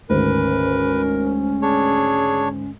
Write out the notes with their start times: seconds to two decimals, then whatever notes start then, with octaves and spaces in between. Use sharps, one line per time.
0.10 D2 G#2 D#3 C#4 A#4 B4
1.62 D4 G#4 C#5